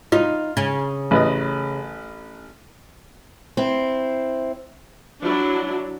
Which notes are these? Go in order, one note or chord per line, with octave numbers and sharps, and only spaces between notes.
D#4 F4
C#3
A1 B4 D#5
C4 E4
F#3 D4 E4